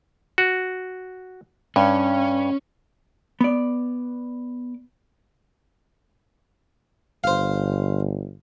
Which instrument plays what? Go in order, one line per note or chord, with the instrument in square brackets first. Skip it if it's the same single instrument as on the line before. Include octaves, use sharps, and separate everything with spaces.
[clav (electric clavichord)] F#4
[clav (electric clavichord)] G2 [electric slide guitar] C#4
[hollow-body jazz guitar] B3 D5
[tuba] G1 [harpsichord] C5 F5